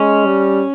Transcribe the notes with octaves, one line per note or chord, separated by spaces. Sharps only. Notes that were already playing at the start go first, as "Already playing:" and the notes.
Already playing: G#3 C#4
G3